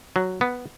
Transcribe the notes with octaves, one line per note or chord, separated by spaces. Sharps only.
F#3
B3